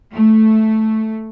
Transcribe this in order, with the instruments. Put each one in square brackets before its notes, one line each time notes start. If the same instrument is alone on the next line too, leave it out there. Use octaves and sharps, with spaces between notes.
[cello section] A3